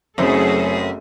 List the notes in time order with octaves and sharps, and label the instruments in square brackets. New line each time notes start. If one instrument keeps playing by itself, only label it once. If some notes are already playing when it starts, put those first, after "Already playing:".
[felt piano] F#1 C4 [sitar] F#2 [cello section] A3 G#4 A4